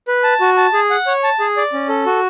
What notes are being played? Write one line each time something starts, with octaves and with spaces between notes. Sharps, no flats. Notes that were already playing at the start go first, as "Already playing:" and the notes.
B4
A5
F#4
A5
G#4
F#5
C#5
A5
G#4
D5
C#4
A4
F#4